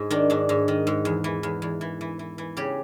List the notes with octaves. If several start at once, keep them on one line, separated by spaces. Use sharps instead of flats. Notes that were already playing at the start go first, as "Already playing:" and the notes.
Already playing: G#2
D#3 D4
G#2 D4
G#2
D#3
G#2
E2
E3
E2
E2
E3
E3
E3
E3
C#3 G4